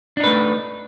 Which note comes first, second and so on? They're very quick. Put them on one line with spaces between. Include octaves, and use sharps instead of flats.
D4 D#4 B4 A3